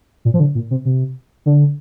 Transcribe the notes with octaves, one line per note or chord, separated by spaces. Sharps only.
A#2
F3
D3
A#2
C3
C3
D3